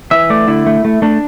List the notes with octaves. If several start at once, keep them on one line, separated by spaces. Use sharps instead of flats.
E3 E5
A3 D5
D3 E4
A3
A3
A3 D4